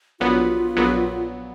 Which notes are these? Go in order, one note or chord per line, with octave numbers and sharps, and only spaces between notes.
A#1 A#2 F#3 B3 F4
A#1 A#2 F#3 B3